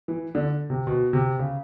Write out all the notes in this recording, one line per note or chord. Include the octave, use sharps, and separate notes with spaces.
E3
D3
C3
B2
C3
C#3